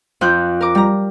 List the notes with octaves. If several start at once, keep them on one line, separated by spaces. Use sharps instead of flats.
F2 F4 F#6 G6
A#4 D6
G3 A#5